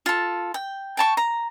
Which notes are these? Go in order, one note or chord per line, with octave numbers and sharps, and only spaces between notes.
F4 A4
G5
G5 A5 C#6
A#5